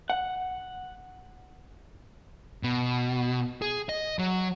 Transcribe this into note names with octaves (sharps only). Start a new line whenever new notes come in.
F#5
B2
G#4
D#5
F#3